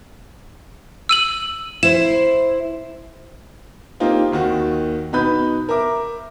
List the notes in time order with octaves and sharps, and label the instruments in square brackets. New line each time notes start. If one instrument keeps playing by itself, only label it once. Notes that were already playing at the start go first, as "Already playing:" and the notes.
[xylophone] E6 D#7 F#7
[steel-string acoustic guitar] E4 C5 [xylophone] E7
[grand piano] A#3 C4 D#4 F4 G4
D#2 D#3 F#4
B2 D#4 B4 B5 G6
A#4 E5 D6